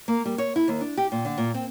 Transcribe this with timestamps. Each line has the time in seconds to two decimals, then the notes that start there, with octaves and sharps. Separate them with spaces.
0.08 A#3
0.25 G3
0.38 C#5
0.56 E4
0.68 D#2
0.81 D4
0.97 G4
1.12 A#2
1.25 D3
1.38 A#2
1.54 C4